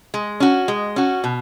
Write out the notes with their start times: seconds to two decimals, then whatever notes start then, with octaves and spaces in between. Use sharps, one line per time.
0.14 G#3
0.40 C#4 F#4
0.68 G#3
0.96 C#4 F#4
1.24 B2